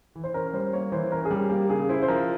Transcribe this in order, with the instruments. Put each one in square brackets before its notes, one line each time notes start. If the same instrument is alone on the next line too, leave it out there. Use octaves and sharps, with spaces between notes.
[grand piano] E3
[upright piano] C5
[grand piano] C#4 [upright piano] A#4
[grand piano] G3 [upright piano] C5
[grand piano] A#3 [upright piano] C#5
[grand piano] E3 [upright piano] C5
[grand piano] C#4 [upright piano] A#4
[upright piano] G#4
[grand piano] G3 [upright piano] G4
[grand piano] A#3 [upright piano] G4
[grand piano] C#3 [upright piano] G#4
[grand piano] E4 [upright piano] C5
[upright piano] C5
[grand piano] F3 [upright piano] A#4